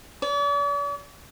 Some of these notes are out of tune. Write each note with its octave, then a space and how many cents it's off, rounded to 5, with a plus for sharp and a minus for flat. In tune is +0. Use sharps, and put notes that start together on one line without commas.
D5 -45